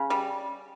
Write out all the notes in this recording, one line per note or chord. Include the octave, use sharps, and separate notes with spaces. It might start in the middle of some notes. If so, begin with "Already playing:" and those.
Already playing: C#3
G3